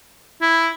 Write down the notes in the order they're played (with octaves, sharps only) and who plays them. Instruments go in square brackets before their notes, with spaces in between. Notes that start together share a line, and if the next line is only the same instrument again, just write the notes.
[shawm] E4